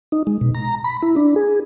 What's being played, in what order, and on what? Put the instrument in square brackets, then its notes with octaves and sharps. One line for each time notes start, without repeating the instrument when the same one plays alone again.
[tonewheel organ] D#4
G#3
B2
A#5
B5
E4
D4
G#4